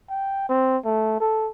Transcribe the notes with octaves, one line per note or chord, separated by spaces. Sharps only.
G5
C4
A3
A4